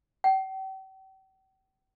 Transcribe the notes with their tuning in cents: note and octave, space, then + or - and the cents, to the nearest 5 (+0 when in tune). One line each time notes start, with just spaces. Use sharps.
G5 -45